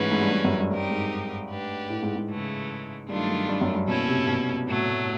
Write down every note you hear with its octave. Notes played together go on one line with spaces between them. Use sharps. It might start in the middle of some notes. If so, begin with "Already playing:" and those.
Already playing: G#2 E3 A3 C#4 F#4 B4
G#2
G2
G#2
F#2
G2
G2 C4 D#4 G4 A#4
G#2
A3 D4 G4 B4
A2
G#2
G#2
C#3 E3 A3
G2 D#3 F#3 A3 D4 F4
G2
G2
F#2
G2
B2 A#3 C#4 E4 A4
C3
B2
A2 F#3 A3